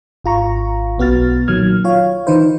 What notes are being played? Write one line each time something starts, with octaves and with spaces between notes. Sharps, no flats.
G#1 F4 A#5 C#6
B1 B3 F#4 F6 A6
A#2 D#3 F#3 F6 G#6
F4 C#5 F5
D#3 E3 D#4 B4 C5